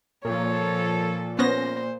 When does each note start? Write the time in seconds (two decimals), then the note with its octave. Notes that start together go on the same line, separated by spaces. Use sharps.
0.25 A#2 F3 A4 C#5
1.39 B3 C#4 C5 A#6